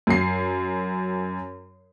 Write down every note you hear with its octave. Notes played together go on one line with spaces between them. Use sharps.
F#2 C7